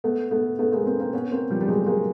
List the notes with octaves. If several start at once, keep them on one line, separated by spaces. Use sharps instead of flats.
A3 B3
A3 B3
A3 B3
G#3 A#3
A#3 C4
A#3 C4
B3 C#4
A#3 C4
F3 G3
G3
F#3 G#3
G#3 A#3